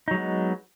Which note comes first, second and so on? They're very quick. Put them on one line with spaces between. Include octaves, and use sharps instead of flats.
D#4 F#3 G#3 B3